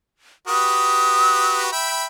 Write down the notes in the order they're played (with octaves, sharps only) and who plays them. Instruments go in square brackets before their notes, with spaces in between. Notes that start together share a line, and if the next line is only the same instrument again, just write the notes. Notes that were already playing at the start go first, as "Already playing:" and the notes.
[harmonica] F#4 G4 B4 [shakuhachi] D#6
[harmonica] E5 G5 B5